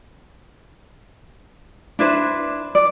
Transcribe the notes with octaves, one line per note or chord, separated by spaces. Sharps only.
D4 E4 B4 C5
D5